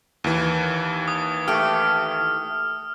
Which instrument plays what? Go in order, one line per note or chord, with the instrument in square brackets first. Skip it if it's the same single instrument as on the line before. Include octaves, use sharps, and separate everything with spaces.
[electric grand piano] D#2 E3
[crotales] D#6
[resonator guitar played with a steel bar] A3 G4 [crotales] F6